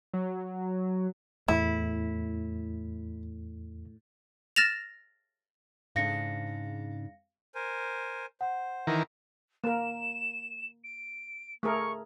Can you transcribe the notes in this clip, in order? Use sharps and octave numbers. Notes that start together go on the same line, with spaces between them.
F#3
E2 A2 E4
F6 A6 A#6 E7 F7
G#2 C#3 D4 F5 A#6 C#7
A#4 C5 G#5
C5 F#5
D#3 E3 A#4
A#3 A#4 E7
D7
A3 G#4 A#4 C#6